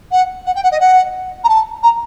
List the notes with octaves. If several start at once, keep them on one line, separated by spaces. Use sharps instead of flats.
F#5
F#5
G5
F#5
D#5
F#5
A#5
A5
A#5